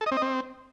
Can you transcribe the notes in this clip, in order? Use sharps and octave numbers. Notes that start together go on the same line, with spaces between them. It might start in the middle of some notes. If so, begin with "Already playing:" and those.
A4
D#5
C4
D#5
C4